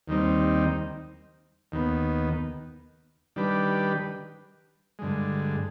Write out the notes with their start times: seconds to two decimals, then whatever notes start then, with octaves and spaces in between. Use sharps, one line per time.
0.08 D#2 D#3 G3 C4 D#4
1.72 D#2 D#3 B3
3.36 D#3 G3 D4 G4 B4
4.99 G2 D3 G#3